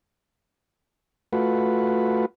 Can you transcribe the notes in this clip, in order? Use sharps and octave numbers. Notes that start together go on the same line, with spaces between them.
A3 F4 F#4 B4